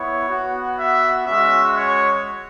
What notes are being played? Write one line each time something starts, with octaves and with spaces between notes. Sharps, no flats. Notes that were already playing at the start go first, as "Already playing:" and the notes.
Already playing: B3 E4 C#5
B3 F#4
E5
G#3 C#4 F#4 E5
C#5